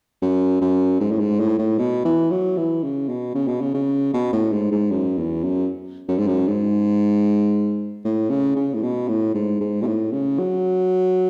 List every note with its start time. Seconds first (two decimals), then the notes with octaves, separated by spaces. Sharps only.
0.22 F#2
0.61 F#2
1.00 G#2
1.11 A2
1.20 G#2
1.40 A2
1.58 A2
1.79 B2
2.05 E3
2.31 F#3
2.57 E3
2.83 C#3
3.09 B2
3.35 C#3
3.47 B2
3.61 C#3
3.74 C#3
4.14 B2
4.33 A2
4.52 G#2
4.72 G#2
4.91 F#2
5.18 E2
5.43 F#2
6.08 F#2
6.18 G#2
6.27 F#2
6.47 G#2
8.05 A2
8.30 C#3
8.56 C#3
8.74 A2
8.83 B2
9.08 A2
9.34 G#2
9.60 G#2
9.82 B2
9.86 A2
10.12 C#3
10.39 F#3